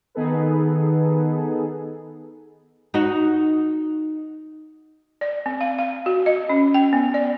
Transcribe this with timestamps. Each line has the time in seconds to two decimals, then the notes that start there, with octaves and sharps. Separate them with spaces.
0.15 D#3 B3 D#4 G#4 A4 B4
2.94 D#4 F#4 D#5
5.21 D5
5.46 C4
5.61 F5
5.78 F5
6.06 F#4
6.26 D#5
6.49 C#4
6.74 G5
6.93 B3
7.14 D5